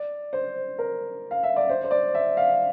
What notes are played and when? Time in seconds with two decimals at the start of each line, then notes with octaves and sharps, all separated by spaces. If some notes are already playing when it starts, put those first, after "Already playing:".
Already playing: D5
0.33 C5
0.79 A#4
1.31 F5
1.43 E5
1.56 D5
1.69 C5
1.84 C5
1.91 D5
2.14 E5
2.37 F5